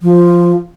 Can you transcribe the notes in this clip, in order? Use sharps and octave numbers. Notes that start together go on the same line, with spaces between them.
F3